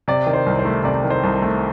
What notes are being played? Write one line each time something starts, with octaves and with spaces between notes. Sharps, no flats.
C3 D5
D#3
C5
C2
C5
A3
C3 D5
D#3
C5
C2
A3